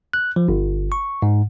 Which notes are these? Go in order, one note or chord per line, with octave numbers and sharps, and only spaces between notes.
F#6
F3
G1
C#6
G#2